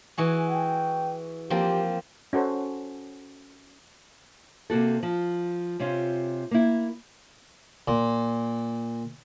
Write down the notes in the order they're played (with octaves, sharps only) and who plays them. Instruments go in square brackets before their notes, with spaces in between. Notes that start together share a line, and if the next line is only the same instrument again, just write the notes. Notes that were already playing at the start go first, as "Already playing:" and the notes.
[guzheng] E3 F#4 G#4
[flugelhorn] G5
[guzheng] F3 A#3 C4 [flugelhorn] G4
[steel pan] C#4 F#4 A4 C5
[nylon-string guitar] C3 A#3 F#4 A4
F3
C3 C4 C#4 F4
A#3 E4
[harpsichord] A#2